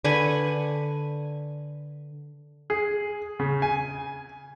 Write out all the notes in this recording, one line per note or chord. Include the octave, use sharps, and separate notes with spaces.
D3 B4 G#5 C#6
G#4
C#3
G#5